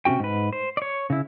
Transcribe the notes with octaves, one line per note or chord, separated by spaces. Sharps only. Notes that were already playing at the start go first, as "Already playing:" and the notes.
C3 E3 C#4 F#4 G5
G#2 B4
C5
C#5 D5
C#3 E4